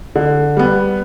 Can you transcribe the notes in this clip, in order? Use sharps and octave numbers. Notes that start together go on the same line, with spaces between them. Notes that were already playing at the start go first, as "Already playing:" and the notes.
D3
G3 B3